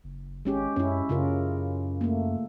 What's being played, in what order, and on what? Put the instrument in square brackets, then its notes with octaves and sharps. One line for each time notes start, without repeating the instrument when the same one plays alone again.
[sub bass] F#1
[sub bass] G#1 [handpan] G#3 C#4 G4
[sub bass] F#2 [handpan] C#4 E4
[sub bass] F#2 [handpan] C#3 F4 A#4
[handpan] A3 A#3